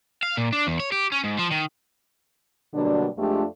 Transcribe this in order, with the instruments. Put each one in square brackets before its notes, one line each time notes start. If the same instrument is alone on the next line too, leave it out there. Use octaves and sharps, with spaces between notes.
[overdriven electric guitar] F5
A#2
D4
E2
C#5
G4
C#4
G#2
F3
D#3
[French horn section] B2 D3 F#3 G3 A#3 D4
F2 G#3 A3 D4 F4 G4